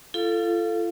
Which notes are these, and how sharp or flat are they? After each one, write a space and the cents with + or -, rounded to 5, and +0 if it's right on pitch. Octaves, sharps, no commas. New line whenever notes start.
F4 -35 A4 +0 F5 +0